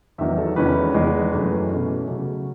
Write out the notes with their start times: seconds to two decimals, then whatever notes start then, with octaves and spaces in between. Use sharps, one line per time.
0.18 E2 D#3 F#3 E5
0.38 A4
0.56 E2 D#3 G#3 C#4 B4
0.94 E2 D#3 G#3
1.32 F#2 E3 A3 C#4
1.69 B2 A3 C#4
2.07 C#3 F#3 A3 A4